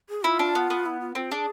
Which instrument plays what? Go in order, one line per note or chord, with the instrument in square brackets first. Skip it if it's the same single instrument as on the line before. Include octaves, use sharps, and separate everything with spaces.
[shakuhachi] G#4
[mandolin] E4 [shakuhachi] F4
[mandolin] D4
B3
B3
[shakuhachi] E4
F4
[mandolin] C4 [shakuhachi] F4
[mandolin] D4 [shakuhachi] G#4